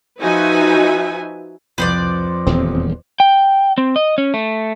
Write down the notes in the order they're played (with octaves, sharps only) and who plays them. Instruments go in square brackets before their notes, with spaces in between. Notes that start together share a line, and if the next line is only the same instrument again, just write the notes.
[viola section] F3 D#4 F#4 B4 E5 G#5
[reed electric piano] C2 [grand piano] F2 F4 [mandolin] B4 C5 D5
[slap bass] D#1 E2 F3 [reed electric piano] C4
[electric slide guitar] G5
C4
D#5
C#4
A3